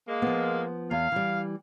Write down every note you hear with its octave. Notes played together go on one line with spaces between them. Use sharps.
G#3 A#3
F3 B3
E2 F5
E3 G3